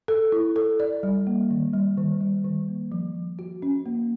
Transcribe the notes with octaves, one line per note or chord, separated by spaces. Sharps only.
A4
E4
A4
D5
G3
A#3
D#3
G3
D#3
G3
D#3
A#3
F3
F3
F#4
C#4
A#3